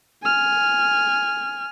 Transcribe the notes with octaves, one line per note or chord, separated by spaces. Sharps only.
G#5 F6